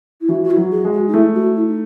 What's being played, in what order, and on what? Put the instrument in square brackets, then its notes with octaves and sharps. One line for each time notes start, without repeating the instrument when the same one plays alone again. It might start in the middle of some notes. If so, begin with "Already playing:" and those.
[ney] E4
[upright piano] E3 [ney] F#4
[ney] F#4
E4
[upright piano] F#3
[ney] G#4
[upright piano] G#3
[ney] F#4
D#4
[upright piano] A3 [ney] E4
[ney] F#4
E4
D#4